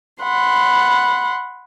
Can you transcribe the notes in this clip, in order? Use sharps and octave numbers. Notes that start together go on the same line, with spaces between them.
F#5 B5 C6